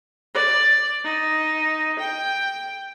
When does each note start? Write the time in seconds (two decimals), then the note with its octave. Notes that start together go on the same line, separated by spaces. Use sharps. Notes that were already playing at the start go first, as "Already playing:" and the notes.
0.35 D5
1.04 D#4
2.00 G5